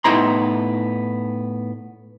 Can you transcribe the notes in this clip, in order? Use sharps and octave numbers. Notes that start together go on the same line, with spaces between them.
A2 B3 D#4 E4 A#5 C6